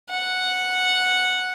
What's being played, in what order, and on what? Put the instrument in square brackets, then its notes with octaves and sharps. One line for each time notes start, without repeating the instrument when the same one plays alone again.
[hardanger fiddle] F#5